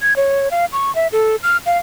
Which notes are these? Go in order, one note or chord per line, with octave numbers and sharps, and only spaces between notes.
G#6
C#5
F5
C#6
E5
A4
F6
F5